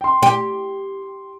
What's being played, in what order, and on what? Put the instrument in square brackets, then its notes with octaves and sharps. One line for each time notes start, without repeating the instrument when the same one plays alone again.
[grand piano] G5 C6
[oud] G4